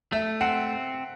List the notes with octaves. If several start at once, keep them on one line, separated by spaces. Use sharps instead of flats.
A3 E5
C4 F#5